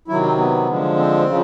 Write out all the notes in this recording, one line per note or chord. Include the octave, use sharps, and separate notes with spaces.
C3 D#3 F#3 E4
C4
B3
D3 F3 G#3
C4
C#3 F3